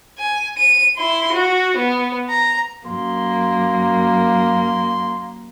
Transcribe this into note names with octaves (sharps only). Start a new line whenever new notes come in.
G#5
D#7
E4 C6
F#4
B3
A#5
F#2 A#3 C6